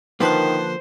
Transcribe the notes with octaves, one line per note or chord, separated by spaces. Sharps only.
D3 D#3 F3 A#3 B4 C5 A5 F#6